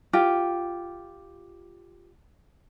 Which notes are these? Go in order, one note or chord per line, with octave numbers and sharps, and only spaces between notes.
F4 G4